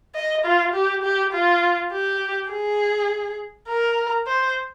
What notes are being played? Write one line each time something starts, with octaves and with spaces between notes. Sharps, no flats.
D#5
F4
G4
G4
F4
G4
G#4
A#4
C5